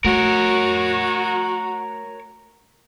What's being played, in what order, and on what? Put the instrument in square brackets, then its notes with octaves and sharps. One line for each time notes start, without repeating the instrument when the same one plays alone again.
[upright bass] A3 [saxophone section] F#4 [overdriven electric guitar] A#4 C#5